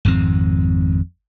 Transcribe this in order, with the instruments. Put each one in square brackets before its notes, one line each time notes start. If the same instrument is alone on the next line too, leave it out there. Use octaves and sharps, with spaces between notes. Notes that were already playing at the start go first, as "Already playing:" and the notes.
[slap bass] G#1 F2 G#2 C4